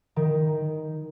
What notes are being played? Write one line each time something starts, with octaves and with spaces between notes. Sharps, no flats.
D#3